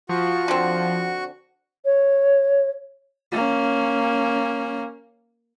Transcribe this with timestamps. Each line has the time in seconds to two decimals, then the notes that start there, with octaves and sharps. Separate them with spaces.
0.09 F3 F#4 C#6
0.48 D3 C4
1.85 C#5
3.32 A#3 C#4